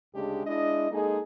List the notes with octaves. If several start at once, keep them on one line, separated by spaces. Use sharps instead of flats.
D2 C#3 G#3 D4 G4
G#3 D4 E4 D#5
G#3 A#3 D#4 G#4 A4